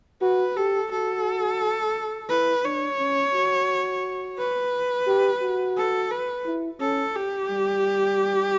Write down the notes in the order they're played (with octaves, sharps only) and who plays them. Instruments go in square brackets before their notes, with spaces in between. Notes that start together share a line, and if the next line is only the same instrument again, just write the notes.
[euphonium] F#4 [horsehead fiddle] B4
[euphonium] G4 [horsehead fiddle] A4
[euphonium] F#4 [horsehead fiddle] A4
[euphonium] E4 [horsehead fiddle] B4
[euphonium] D4 [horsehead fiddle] C#5
[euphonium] C#4
F#4
[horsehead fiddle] B4
[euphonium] G4
F#4
[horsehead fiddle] A4
B4
[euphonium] E4
[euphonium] C#4 [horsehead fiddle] A4
[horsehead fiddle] G4
[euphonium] G3